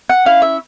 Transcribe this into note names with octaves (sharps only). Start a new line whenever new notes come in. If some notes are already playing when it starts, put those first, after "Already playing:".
F#5
C#4 E4 F5
E5